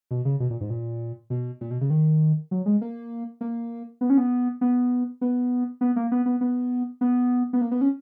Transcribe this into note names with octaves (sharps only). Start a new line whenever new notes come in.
B2
C#3
B2
A#2
G#2
A#2
B2
A#2
B2
C#3
D#3
F#3
G#3
A#3
A#3
B3
C#4
B3
B3
B3
B3
A#3
B3
B3
B3
B3
B3
A#3
B3
C#4